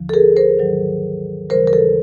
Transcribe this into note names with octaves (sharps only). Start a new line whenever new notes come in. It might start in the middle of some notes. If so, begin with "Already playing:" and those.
Already playing: D#2 D3 F3
A4
G#4 A#4
A#4 C5
G#2 D#3 F#3
D#2 C#3 E3 G3 A#4 C5
A#4
A4 B4